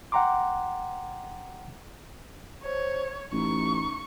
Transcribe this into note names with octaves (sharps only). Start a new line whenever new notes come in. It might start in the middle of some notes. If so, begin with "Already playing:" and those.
F#5 G5 A#5 C6 D6
C5 C#5
A1 D#4 C#6